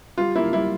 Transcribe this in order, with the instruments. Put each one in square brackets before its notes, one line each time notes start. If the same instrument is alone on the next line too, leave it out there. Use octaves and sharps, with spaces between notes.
[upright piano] G3 F4
A#3 E4
G3 E4